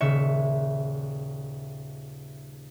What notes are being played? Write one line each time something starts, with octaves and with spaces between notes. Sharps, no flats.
D#1 C#3 E5 C#7